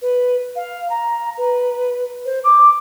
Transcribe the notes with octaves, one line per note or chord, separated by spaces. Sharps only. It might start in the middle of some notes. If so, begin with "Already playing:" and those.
B4
F5
A#5
B4
C5
D6